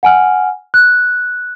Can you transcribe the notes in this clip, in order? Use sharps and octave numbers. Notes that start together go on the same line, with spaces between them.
F#5 G#5 F6
F#6